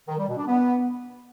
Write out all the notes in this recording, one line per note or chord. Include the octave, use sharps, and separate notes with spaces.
D#3
G3
B2
D4
B3